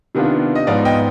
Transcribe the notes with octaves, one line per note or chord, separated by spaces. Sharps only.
C3 D#3 B3 D4 F4
D#5
G#2 F3 B3 D5 F5
D#5 G5